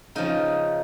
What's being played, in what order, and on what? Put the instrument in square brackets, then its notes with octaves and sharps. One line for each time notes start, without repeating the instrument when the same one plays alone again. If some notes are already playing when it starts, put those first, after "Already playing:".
[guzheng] C#3 F3 D#4